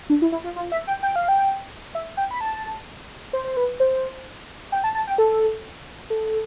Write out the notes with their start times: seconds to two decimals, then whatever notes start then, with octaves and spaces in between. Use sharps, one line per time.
0.10 D4
0.22 E4
0.32 E4
0.44 F4
0.56 F4
0.72 E5
0.87 G5
1.03 G5
1.16 F5
1.28 G5
1.95 E5
2.17 G5
2.31 B5
2.41 A5
3.33 C5
3.44 C5
3.57 B4
3.80 C5
4.72 G5
4.84 A5
4.95 A5
5.07 G5
5.18 A4
6.10 A4